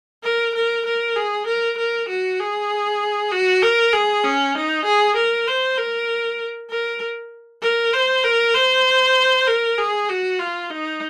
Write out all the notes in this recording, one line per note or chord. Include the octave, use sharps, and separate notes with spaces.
A#4
A#4
A#4
G#4
A#4
A#4
F#4
G#4
F#4
A#4
G#4
C#4
D#4
G#4
A#4
C5
A#4
A#4
A#4
C5
A#4
C5
A#4
G#4
F#4
F4
D#4